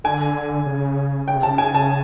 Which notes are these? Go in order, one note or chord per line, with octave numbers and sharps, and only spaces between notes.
D3 G#5
C#3
C#3 G5
C3
A5
C#3
G#5
A5